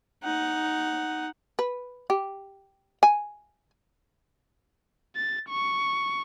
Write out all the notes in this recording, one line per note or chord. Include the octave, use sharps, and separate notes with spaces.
D#4 F#5
B4
G4
G#5
A6
C#6